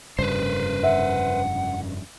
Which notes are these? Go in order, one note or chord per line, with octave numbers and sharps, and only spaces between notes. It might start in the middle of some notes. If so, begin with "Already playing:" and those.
F1 G2 C#3 B4 C5
E5 F#5